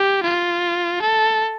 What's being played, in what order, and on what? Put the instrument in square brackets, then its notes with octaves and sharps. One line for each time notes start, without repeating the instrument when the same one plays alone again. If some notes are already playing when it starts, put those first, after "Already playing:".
Already playing: [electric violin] G4
F4
A4